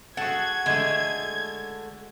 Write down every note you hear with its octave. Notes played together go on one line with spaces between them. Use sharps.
F#4 G#4 A4 F#5 G#6
D3 G#3 A3 G#4